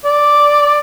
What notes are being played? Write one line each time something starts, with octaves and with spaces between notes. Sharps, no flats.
D5